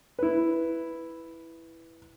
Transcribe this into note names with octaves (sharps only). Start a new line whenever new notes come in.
E4 B4